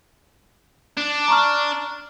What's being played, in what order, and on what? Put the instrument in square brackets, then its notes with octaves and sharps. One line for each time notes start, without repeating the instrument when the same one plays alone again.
[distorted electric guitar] D4
[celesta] A#5 C#6 F6